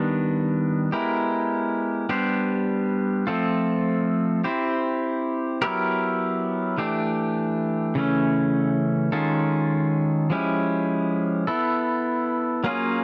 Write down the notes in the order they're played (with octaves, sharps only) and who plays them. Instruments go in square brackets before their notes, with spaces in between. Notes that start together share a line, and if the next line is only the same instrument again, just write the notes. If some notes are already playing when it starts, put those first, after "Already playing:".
Already playing: [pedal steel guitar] D#3 G3 B3 D4
G#3 B3 E4 G4 A#4
G3 B3 D4 G4 C5
F3 A3 C4 F4 A4
C4 E4 G4 C5
F#3 B3 E4 G4 A#4
E3 A3 D4 G4
C#3 E3 A3 C#4
D#3 G#3 C#4 F4 A4
F3 G#3 C#4 E4 G4
B3 E4 A4
F#3 A#3 C#4 F4 G#4